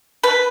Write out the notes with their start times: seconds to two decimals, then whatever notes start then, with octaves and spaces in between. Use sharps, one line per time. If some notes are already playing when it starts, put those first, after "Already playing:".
0.24 B4